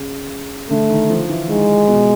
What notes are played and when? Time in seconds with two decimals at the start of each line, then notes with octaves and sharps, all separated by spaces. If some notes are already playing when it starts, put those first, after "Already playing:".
Already playing: C#3
0.70 D3 A3
0.90 D#3
1.10 F3
1.29 E3
1.49 D#3 G#3
1.88 B2